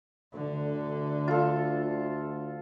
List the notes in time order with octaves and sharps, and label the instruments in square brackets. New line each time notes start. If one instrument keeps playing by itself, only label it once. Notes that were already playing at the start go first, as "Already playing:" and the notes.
[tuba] D2 [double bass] D3
[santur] F4 A4